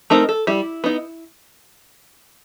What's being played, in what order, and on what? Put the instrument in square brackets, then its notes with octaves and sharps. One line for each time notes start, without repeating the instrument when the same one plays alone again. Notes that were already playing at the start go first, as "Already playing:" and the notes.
[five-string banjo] A3 C4 D#4 A#4
A4
G3 E4
B3 D#4